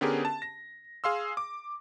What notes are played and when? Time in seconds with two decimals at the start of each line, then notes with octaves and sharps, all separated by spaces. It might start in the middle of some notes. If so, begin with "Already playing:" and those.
0.01 D3 B3 C#4 G4 G#4 A#4
0.25 A5
0.42 A#6
1.04 G#4 F5 C6 E6
1.37 D6